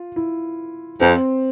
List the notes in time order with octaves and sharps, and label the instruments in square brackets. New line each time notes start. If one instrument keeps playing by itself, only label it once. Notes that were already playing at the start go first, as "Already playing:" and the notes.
Already playing: [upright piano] F4
E4
[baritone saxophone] F2 [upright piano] C4